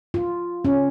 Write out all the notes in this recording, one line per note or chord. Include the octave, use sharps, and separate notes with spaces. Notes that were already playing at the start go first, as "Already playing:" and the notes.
F4
C#4